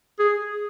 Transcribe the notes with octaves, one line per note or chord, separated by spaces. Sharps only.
G#4